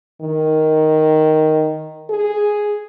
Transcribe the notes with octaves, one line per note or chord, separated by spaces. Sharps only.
D#3
G#4